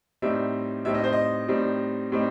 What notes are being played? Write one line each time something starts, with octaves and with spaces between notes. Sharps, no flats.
A2 G3 C4 D#4 E5
A2 G3 C4 D#4 E5
D#5
C5
D#5
A2 G3 C4 D#4
A2 G3 C4 D#4